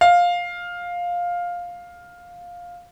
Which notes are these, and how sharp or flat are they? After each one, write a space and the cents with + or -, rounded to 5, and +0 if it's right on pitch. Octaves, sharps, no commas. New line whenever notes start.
F5 +10